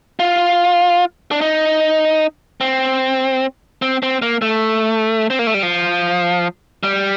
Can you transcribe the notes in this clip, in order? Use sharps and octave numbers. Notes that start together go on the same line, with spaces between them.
F4
D4
D#4
C4
C4
C4
A#3
A3
C4
A#3
A3
G3
F3
G3